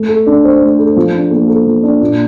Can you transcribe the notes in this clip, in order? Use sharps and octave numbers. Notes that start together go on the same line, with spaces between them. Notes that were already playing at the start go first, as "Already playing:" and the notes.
Already playing: A3
A4
D4
C5
A3
A4
F3
D4
A#3
A4
F3
D4
A#2